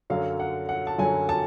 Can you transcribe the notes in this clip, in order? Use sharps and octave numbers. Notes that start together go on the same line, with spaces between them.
F#2 D3 F#3 F5
F#5
F#5
A5
F#2 D3 F#3 G#5
A5